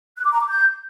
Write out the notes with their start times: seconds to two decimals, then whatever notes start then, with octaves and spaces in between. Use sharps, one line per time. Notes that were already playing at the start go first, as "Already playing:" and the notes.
0.17 F#6
0.25 D6
0.33 A#5
0.40 D6
0.48 G6